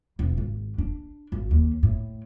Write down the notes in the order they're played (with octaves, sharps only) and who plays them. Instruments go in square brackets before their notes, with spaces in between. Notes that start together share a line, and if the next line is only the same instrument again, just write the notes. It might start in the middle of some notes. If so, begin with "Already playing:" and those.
[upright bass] E1
G#1
D4
G#1
D#2
A2